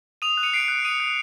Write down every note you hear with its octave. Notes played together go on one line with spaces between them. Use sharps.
D#6 D#7 F7
F#6
C#7 D#7
D#6 C7 D7
F#6
D#6 C#7 D#7
F#6